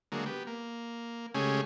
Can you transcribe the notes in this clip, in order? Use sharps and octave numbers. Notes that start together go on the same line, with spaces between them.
D3 F#3 G#3 A#3
B3 G4
A#3
C#3 G#3 A3 C#4 G4 G#4